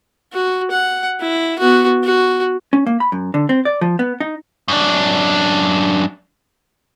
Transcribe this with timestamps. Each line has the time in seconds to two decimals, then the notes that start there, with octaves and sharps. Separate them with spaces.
0.33 F#4
0.71 F#5
1.21 E4
1.59 B3 F#4
2.03 F#4
2.73 C#4
2.86 A#3
3.00 B5
3.12 F#2
3.34 D3
3.49 C4
3.65 D5
3.81 F3
3.99 B3
4.20 D#4
4.68 F#2 D4